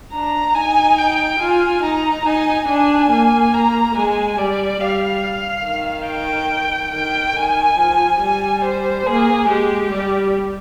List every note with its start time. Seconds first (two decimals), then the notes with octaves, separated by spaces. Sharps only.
0.13 D4 A#5
0.55 D#4 G#5
0.98 G5
1.40 F4 G#5
1.83 D#4 A#5
2.26 D#4 G#5
2.68 D4 G#5
3.11 A#3
3.54 A#5
3.96 G#3 G#5
4.38 G3 D5
4.80 G3 F5
5.66 D#3
6.08 G5
6.94 D#3 G5
7.36 D#3 G#5
7.79 F3
8.21 G3 G#5
8.64 C5
9.07 A#3 G#4
9.49 G#3 G4
9.92 G3